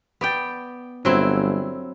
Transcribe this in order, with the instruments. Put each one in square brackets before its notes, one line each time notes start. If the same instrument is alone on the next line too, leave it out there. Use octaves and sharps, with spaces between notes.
[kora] B3 D5 G5
[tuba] G1 [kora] F#3 C4 E4